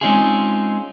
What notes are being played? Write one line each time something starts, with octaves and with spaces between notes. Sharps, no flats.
G#3 C4 C#4 D#4 F4 G#4